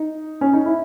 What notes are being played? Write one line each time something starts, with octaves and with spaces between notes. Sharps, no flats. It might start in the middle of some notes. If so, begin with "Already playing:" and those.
Already playing: D#4
C#4
D#4
E4